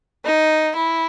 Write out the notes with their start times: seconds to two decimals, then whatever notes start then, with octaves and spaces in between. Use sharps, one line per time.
0.25 D#4
0.75 E4